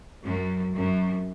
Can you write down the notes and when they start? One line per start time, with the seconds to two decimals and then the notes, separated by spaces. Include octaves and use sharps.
0.23 F#2
0.74 F#2